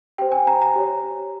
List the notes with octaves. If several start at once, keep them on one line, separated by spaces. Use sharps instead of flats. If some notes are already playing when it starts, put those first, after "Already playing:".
G4 C5 G5
G#5
A#5
A#5
G4 C#5